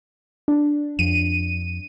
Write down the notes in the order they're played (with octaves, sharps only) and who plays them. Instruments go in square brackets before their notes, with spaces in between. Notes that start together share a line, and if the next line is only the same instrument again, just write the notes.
[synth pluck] D4
[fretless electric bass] F2 [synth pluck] D#7